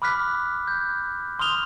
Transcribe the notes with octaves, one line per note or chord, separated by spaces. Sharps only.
B5 D6 F6 F#6 B6
G6
C6 D#6 F6 F7 G7